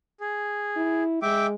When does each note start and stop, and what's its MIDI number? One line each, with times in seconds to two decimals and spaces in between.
0.20 1.03 68
0.77 1.20 64
1.22 1.55 56
1.22 1.47 76
1.22 1.47 79
1.22 1.47 86